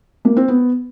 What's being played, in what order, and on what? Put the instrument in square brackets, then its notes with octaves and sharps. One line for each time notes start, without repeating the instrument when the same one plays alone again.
[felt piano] A#3
C4
B3